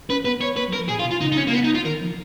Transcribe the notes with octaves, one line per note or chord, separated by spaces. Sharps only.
C#4 B4
B3 B4
C#5
A#3 B4
F#3
A#4
F3
A#2 G#4
F4
B2
F4
C#3 D#4
D#4
C#4
A#3
B3
D#4
F4
D#3 A#4
F3